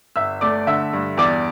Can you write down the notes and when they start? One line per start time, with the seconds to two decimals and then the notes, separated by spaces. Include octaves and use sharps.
0.16 G1 E5 E6
0.41 A3 D5 D6
0.67 D3 E5 E6
0.93 G2
1.17 E2 D5 D6